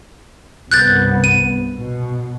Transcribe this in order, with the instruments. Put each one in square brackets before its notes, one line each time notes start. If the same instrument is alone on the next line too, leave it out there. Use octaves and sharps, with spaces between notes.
[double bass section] C2 G2 B3 [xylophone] F#6 G6 A6
[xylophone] D#7
[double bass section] B2